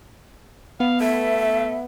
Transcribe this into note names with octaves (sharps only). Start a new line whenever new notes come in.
B3 F5
A3 E5